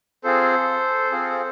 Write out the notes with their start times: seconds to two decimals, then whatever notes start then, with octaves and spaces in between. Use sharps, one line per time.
0.24 C4 F4 G#4 A4 C5
1.11 C4 F4 G#4